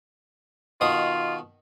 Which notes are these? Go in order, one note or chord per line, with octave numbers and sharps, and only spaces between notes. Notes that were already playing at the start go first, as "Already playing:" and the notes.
B2 D#3 F4 D#6